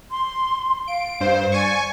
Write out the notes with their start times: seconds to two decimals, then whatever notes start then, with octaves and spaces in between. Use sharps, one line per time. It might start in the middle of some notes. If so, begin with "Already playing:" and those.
0.11 C6
0.88 F5 D7
1.20 G2 C5
1.52 D5 G#5 C#6